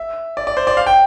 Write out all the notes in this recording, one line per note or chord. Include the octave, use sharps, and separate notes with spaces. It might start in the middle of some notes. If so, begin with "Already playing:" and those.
Already playing: E5
D5
D5
C5
D5
F5
G5